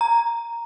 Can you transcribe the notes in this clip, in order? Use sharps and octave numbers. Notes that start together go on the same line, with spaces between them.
A#5